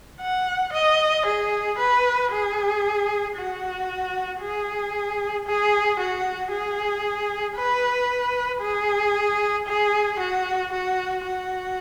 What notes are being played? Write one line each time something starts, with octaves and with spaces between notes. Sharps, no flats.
F#5
D#5
G#4
B4
G#4
F#4
G#4
G#4
F#4
G#4
B4
G#4
G#4
F#4
F#4
F#4